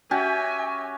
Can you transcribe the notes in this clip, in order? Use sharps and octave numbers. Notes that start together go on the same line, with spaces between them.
C#4 F#4 G4 E5 G#5